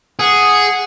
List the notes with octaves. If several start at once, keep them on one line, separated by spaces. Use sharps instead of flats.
G#4 F#5